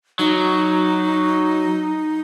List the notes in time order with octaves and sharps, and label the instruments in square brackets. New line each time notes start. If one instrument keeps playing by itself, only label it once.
[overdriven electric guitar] F#3 [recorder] D#4